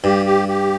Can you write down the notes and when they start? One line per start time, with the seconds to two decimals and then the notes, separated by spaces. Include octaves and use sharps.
0.04 G2 G4
0.26 G4
0.48 G4